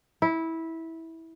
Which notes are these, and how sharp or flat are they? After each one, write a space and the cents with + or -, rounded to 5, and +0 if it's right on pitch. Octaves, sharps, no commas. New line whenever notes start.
E4 -15